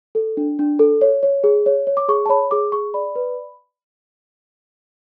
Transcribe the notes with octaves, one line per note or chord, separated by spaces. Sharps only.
A4
D4
D4
A4
C#5
C#5
G#4
C#5
C#5
D6
G#4 C#6
A5
C#5 B5
G#4 D6
G#4 C#6
D5 B5
B4